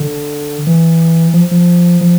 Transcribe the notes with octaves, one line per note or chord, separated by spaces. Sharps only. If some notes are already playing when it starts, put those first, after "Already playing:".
Already playing: D3
E3
F3
F3
F3